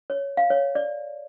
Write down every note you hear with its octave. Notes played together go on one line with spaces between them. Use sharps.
C#5
F5
C#5
D5